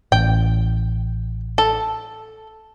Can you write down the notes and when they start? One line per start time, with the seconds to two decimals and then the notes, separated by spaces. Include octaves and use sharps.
0.12 A1 G5
1.58 A4